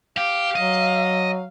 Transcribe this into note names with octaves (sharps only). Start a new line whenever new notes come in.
G4 F5
F#3 D#5